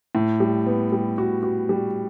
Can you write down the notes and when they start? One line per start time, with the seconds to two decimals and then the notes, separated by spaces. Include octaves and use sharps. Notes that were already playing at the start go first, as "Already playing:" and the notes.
0.15 A2
0.40 G3
0.66 B3
0.92 G3
1.18 F#4
1.43 F#4
1.69 G3